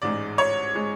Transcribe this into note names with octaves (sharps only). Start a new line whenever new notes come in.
A1 G#2 G#3 D5
C#5
G#3